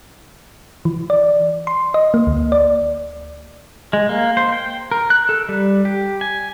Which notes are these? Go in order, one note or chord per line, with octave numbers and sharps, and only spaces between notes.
E3
D5
C6
D#5
A#3
D2
D5
G#3
A#3
C5
G5
A#4
F#6
A4
G3
G4
G#5